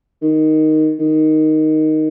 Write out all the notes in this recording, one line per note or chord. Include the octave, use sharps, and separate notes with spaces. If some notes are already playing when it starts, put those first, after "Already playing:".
D#3
D#3